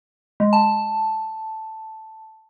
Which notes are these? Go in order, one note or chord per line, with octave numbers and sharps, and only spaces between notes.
G#3
A5